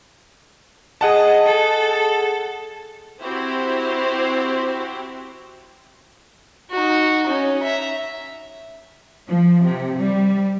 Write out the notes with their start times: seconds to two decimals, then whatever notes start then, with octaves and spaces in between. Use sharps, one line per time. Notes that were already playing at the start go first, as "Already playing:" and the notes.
1.01 G#4 D#5 F#5 A5
1.46 A4
3.21 C4 E4 F#4 G4 C5
6.71 D#4 F#4
7.27 C#4 D#4
7.63 E5 A#5
9.28 F3
9.64 C3
10.00 G3